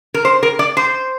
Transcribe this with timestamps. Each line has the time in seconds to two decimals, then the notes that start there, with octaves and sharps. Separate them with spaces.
0.14 A#4
0.25 C5
0.43 A#4
0.59 D5
0.77 C5